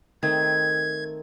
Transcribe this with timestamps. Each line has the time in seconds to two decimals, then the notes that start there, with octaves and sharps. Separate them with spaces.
0.23 D#3 A3 C4 G#6